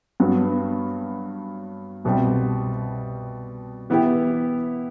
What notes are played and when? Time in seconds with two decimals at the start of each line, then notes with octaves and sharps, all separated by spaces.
0.20 G2 F#3 B3 F#4
2.04 C2 B2 G3 C4
3.90 E3 B3 E4 G4